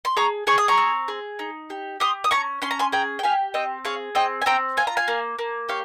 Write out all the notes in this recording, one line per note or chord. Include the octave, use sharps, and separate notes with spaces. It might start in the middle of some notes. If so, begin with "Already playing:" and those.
C6
G#4 A#5 C#6
G#4 C#6
D#6
A#5 C#6
C4
G#4
D#4
G4
G4 C6 D#6
D#6
C#4 A#5 C#6
C#4 C6
A#5
G#5 C6
G#4 G5 A#5
G5
G4 F5 G#5
C4 D#5 G5
G#4 C#5 F5
C4 D#5 G5
G#5
C4 G5 A#5
F4 G#5
A#5
F5 G#5
A#3
A#3
G4 C#5 F5